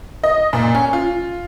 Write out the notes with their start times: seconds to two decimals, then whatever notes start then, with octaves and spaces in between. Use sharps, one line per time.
0.23 D#5
0.53 A#2
0.75 C#4
0.93 F4